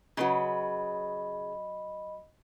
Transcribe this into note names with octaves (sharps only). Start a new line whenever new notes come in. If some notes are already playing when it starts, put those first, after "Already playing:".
C#3 F#3 B4 D#5 B5 C6